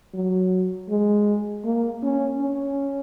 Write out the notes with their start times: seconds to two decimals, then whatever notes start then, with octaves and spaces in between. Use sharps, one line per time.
0.14 F#3
0.89 G#3
1.65 A#3
2.03 C#4
2.41 C#4